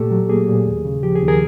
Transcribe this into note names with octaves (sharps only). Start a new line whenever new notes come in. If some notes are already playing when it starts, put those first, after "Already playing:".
Already playing: A#2 A3 G4 A4
F#3
A#3 G#4
A#2
D#2
C#3
F3 G4
G#4
D#2
G#4 A#4